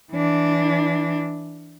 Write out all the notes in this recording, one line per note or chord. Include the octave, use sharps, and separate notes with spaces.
E3 D4